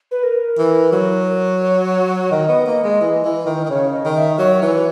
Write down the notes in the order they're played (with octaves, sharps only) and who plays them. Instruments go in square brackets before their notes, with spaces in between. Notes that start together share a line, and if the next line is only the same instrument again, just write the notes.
[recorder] B4
A#4
[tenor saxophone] E3
F#3
[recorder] C#5
[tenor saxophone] D#3 [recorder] D#5
[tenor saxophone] B3
A#3
G#3
E3
E3
D#3
D#3
[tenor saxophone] C#3 [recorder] C#5
[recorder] D#5
[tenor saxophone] D#3
[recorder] E5
[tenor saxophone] F#3 [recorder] C#5
[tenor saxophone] E3